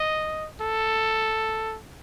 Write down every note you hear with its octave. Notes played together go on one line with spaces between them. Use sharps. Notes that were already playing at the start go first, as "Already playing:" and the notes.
Already playing: D#5
A4